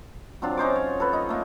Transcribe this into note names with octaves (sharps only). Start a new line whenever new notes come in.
F#3 C4 D4 F4
C#4 D#4 C5 D6
C#5
A4 B4
D#4 D#5
A3 A#3